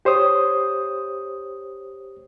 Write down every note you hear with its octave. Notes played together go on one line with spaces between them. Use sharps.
G4 C5 C#5 D#6